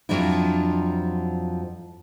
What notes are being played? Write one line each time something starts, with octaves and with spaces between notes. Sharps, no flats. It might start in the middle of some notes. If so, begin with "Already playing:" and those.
F2 F3 F#3 D4 E4